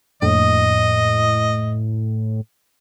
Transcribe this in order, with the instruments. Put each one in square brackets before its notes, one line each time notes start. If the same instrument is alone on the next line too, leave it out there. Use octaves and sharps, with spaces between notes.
[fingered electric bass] F2 A#3 D4 [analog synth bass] A2 [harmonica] D#5